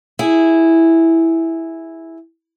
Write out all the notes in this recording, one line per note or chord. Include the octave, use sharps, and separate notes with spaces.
E4 G#4